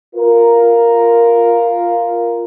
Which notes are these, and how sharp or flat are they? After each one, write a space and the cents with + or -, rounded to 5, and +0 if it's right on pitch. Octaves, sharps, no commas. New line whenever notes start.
F4 +0 A#4 +0